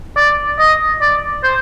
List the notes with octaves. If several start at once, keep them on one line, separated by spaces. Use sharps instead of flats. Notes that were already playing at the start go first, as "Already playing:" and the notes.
D5
D#5
D5
C5